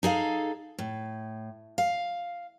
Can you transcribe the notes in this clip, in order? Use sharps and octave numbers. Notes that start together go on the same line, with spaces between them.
D#4 G#4 A4 F5
A2
F5